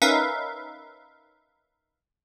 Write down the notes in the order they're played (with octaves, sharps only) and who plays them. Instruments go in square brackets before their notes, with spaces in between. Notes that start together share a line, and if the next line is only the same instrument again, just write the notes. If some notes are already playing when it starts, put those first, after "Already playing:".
[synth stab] C#4 D#4 A#4 B4 E5 F5